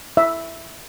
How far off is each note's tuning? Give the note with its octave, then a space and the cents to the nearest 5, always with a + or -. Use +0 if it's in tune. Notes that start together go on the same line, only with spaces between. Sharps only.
E5 +0